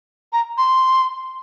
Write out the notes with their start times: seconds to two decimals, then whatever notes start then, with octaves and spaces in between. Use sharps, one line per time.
0.33 A#5
0.58 C6